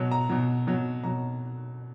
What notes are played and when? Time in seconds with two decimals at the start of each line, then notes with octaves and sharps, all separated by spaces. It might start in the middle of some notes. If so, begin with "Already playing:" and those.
Already playing: B2 F#3
0.11 A#5
0.29 B2 F#3
0.67 B2 F#3
1.03 B2 F#3 A#5